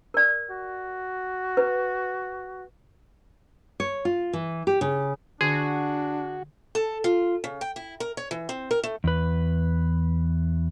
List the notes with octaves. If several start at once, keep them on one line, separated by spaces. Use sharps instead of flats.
A#4 D5
F#4
B4
C#5
F4
E3
G4
C#3
D3 D4 F#4 G#4
A4
F4
C#3
G5
E4
A#4
C#5
E3
C4
A#4
A3
E2 B4